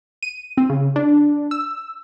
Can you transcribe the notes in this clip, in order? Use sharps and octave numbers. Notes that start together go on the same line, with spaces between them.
D#7
C4
C#3
D4
E6